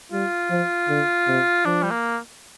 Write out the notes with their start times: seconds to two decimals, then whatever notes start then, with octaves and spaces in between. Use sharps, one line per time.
0.12 G3 F4
0.50 F3
0.89 D3
1.27 C3
1.65 F3 D4
1.83 G3
1.91 A#3